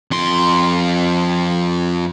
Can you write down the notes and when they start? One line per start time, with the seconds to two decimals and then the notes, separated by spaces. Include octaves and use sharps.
0.11 F2 C6